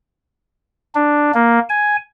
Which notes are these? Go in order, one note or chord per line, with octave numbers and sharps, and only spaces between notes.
D4
A#3
G#5